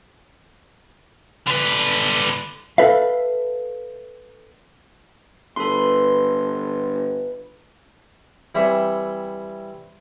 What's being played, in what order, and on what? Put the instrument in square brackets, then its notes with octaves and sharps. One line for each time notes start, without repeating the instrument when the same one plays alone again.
[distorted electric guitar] D3 B4
[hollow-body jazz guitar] A4 B4 E5 F5
[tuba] G1 [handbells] A4 C6 [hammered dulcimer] B4
[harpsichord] E3 G3 C4 C#5 E5